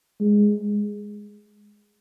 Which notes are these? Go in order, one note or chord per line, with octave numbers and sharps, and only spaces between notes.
G#3